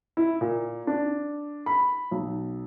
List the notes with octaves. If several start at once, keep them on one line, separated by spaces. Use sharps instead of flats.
E4
A#2
D4
B5
B1